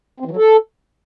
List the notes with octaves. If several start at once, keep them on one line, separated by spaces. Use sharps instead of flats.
C4
E3
F#3
A4